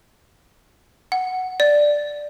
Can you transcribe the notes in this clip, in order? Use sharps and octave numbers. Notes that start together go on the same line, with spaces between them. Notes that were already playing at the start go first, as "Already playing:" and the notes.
F#5
D5